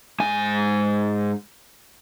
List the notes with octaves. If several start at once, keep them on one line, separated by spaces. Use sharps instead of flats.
G#2 G#5